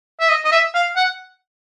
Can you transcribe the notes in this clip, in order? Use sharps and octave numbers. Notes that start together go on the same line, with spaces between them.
E5
D#5
D#5
E5
F5
F#5